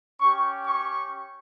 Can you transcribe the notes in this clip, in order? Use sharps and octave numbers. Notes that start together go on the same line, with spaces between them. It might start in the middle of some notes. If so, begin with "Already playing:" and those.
C#4 G4 C#6
C#6